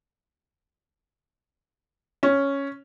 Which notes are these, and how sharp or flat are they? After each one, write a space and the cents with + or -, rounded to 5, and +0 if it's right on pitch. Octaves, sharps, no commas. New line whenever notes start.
C#4 +0